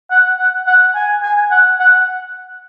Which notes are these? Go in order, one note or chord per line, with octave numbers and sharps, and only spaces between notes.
F#5
F#5
F#5
G#5
G#5
F#5
F#5